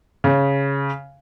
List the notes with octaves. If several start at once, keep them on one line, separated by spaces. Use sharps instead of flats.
C#3